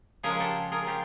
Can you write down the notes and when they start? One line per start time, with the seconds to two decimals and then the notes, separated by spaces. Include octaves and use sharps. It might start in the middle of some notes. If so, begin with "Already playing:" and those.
0.23 C#3 F3 G#3 G#4 A#4
0.40 G4 A4
0.72 G#4 A#4
0.87 F4 G4